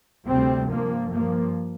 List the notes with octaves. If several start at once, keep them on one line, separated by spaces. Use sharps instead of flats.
D2 C3 G3 C4
G2 F3 A#3
G2 F3 A#3